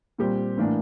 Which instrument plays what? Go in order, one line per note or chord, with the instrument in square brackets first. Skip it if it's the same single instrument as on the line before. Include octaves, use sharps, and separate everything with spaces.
[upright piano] A#2 G3 C4 G4
A2 E3 A#3 D4